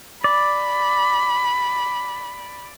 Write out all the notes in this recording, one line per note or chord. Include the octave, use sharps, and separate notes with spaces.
D5 B5